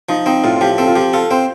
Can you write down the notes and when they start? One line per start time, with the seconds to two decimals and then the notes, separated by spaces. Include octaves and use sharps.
0.09 F3 D#4
0.26 C4 D#4
0.44 A2 F4
0.56 F4
0.61 F3 G4
0.78 C4 A4
0.87 F4
0.95 F3 G4
1.13 F4 A4
1.31 C4 C5